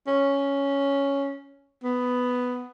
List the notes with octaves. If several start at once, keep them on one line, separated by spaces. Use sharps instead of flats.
C#4
B3